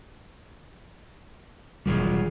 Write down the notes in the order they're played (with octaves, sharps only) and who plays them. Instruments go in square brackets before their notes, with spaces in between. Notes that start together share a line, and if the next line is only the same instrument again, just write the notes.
[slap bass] E1 D#3 F#3 [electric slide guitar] G3 F4 G#4